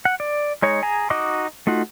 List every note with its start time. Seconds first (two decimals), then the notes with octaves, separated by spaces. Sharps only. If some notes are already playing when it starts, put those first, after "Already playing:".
0.05 F#5
0.20 D5
0.62 G#3 D#4 C#5
0.82 G#4 G#5 A#5
1.10 D#4 F#4 D#5 D6 D#6
1.67 A3 D#4 F4 F#4